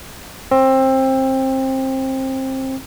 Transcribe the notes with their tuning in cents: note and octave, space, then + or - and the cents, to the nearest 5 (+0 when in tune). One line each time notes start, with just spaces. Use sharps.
C4 +20